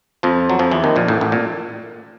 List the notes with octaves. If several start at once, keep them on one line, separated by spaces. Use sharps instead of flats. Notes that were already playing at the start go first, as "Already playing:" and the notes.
F2 F3
F#3
F2 F3
E2 E3
D#2 D#3
A#1 A#2
A1 A2
A1 A2
A#2